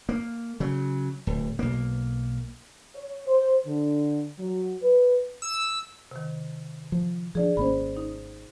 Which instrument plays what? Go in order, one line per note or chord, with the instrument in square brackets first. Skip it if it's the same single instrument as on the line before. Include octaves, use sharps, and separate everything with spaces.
[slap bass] A#3
C#3 F#3
D1
B1 A#3
[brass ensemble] C#5
C5
D3
F#3
B4
[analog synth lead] E6
[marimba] C3 D#3
[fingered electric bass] F3
[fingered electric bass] F3 D4 [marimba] G#4 D5
[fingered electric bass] G#1 A#3 C#4 [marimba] C5 B5
[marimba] D#4